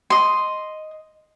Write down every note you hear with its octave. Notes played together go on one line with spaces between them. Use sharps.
D#5 C6